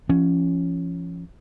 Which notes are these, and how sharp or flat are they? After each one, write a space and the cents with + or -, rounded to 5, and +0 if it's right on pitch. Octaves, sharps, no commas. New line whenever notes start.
F3 -30 C#4 +0